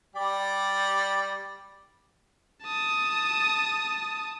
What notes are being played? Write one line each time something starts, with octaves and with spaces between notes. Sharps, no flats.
G3 G4 D5
A5 D#6